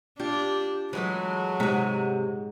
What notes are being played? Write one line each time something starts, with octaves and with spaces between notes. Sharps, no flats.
D4 F4 G4
E3 F#3 G#3 A3
G#2 C3 G#3 F#5